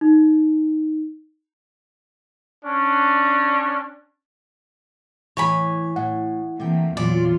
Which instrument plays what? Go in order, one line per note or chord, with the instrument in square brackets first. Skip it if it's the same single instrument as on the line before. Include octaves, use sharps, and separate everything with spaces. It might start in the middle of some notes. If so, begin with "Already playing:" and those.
[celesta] D#4
[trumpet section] C#4 D4
[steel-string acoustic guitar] A2 E3 [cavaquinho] C#5 G#5 B5
[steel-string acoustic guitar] A2 [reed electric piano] F#5
[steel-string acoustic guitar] C3 G5 [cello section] E3 A3 A#3
[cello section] E2 F#3 F4 [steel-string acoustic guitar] A#2 [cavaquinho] D5